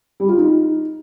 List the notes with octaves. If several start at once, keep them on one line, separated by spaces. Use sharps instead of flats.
G3
F4
D#4